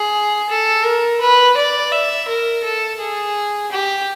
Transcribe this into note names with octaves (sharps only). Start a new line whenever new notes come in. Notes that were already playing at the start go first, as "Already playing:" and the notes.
Already playing: G#4
A4
A#4
B4
D5
E5
A#4
A4
G#4
G4